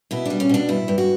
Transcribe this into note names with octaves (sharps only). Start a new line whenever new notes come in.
B2 E4
G3 D4
C#4
B2 D4
G2 E4
G2
F#4